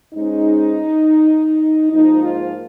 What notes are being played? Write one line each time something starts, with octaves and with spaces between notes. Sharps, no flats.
G#2 G#3 C#4 D#4
G#2 F3 A#3 D#4
F4